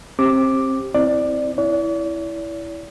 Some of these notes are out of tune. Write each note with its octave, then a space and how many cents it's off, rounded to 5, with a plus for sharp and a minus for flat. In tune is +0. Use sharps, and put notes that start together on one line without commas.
C4 +25 G4 +0 D6 +0
C4 +0 E4 -10 D5 +15
E4 +0 D5 -45